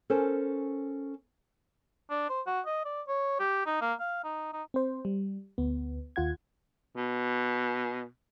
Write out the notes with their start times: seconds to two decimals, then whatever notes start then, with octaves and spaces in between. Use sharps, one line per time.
0.10 C#4 A4 A#4 C5
2.10 D4
2.29 C5
2.47 F#4
2.66 D#5
2.85 D5
3.08 C#5
3.40 G4
3.66 D#4
3.81 A#3
4.00 F5
4.24 D#4
4.53 D#4
4.74 C4 C5
5.05 G3
5.58 D2 B3
6.16 D#2 F4 F#5 G#6
6.96 B2